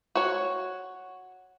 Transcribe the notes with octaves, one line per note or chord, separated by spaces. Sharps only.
F#4 C#5